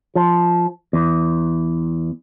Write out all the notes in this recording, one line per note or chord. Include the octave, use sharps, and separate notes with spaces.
F3
E2